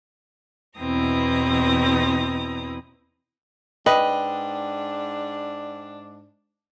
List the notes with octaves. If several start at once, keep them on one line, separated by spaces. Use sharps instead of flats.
E2 B2 C4 E4 A#5 D#6
G#2 D4 B4 D#5 G5